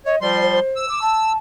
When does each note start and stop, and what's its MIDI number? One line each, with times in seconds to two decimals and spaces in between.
0.06 0.16 73
0.06 0.18 75
0.21 0.60 53
0.21 0.60 55
0.21 0.38 74
0.21 0.60 84
0.42 0.88 72
0.76 1.33 88
0.88 0.99 86
1.01 1.36 81